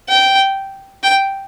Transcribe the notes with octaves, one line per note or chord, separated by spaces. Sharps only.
G5
G5